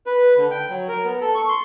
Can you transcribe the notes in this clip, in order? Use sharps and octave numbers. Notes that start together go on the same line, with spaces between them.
B4
D3
G5
F#3
A#4
B3
A4
C#6
C6